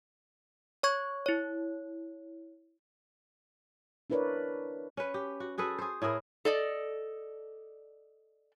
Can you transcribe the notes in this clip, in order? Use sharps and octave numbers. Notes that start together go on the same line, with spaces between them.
C#5 C#6 G#6
E4 C#5
D4 E4 A#4 B4 C#5 D5
C#4 B4
G4
F#4
F#4 G#4 A4 B4
G#4 C5
A2 E4 G#4 A#4
A4 D5 D#5